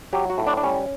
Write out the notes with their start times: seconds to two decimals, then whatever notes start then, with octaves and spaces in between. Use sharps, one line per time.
0.13 F#3 G4
0.30 F#4
0.38 A2
0.47 D4
0.57 D4
0.63 G3 C#4